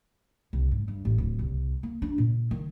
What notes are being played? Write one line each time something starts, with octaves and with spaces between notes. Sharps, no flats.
C2
G#2
G2
A1
D1
C2
A#3
D4
A#2
D#3